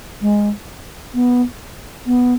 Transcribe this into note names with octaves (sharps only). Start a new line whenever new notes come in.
G#3
B3
B3